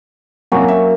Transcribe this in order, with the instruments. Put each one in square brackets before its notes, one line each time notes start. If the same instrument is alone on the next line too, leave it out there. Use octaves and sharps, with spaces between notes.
[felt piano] C2 F#3 [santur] A#3 C#4 F#4
[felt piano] F#3 E5